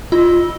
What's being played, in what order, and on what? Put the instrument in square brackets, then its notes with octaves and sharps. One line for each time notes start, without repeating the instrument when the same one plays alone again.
[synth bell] F4